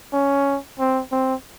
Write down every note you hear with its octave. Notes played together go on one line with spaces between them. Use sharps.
C#4
C4
C4